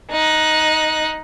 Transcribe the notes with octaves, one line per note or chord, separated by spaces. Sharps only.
D#4 F#6